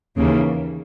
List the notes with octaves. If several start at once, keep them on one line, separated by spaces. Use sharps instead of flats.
D#2 C#3 E3 A#3